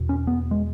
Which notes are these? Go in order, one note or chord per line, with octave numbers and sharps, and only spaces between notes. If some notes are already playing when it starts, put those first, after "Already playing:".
Already playing: E2 B2
C#4
B3
G#3